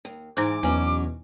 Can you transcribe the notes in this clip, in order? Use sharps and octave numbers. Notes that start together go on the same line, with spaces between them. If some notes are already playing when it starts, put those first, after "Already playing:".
D#2
G#2 E3 D#4 C5 D6
E2 B2 F#3 C#4 G#5